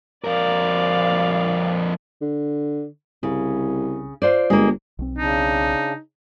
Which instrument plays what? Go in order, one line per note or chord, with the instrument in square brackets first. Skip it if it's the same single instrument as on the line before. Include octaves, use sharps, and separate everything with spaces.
[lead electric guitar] F2 A#4 [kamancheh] D5 F5
[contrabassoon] D3
[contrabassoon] C2 [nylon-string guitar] C#3
[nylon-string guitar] F4 C5 D5
[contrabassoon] G1 [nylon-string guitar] G#3 A#3
[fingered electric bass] B1 C4
[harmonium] C#3 D4 [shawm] D#4